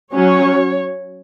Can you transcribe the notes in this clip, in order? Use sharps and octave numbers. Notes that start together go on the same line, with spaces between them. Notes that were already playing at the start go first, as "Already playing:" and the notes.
F#3 C#4 C#5